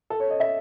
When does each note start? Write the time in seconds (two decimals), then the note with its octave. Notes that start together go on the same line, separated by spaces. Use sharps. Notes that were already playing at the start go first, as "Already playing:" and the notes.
0.10 A4
0.20 C#5
0.30 D#5
0.40 E5